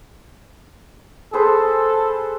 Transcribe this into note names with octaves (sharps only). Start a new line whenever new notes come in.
G#4 A4 B4 C5